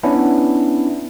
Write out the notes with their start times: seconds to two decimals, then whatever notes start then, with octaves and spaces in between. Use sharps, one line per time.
0.03 B3 C#4 D4 E4